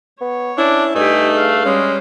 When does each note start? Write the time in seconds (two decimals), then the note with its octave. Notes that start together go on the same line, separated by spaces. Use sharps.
0.21 B3 C#5
0.58 C#4 D4 E4
0.95 G2 A3 D#4 G4 G#5
1.34 G#4 F5
1.65 G3 G#3 C#4